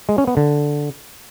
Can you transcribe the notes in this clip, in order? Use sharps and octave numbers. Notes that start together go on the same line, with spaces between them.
G#3
C#4
B3
D3